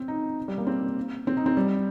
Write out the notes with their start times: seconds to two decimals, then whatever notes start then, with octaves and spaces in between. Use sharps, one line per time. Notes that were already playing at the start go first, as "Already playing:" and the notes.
Already playing: C4
0.08 D#4
0.48 G3
0.58 A#3
0.67 C4
1.27 C4
1.37 D#4
1.46 C4
1.57 G3